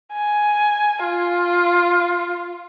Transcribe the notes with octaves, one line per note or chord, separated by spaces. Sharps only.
G#5
F4